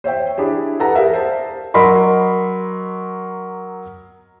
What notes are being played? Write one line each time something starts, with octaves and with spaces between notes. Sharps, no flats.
C5 C#5 E5 G5
D4 E4 G4 G#4
G4 A4 B4 F#5 A5 A#5
G4 G#4 A#4 D5 E5 F5
C5 A5
F#3 A#4 D#5 B5 C6